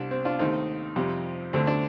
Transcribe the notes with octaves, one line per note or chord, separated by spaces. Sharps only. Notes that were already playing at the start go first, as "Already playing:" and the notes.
Already playing: C2 C3 G3 D4
C4
D4 F4
D#2 D#3 A3 C4 D#4
F2 C3 G3
D2 D3 A3 C4
D4